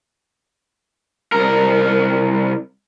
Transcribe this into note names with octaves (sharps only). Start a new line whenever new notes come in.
C2 A#4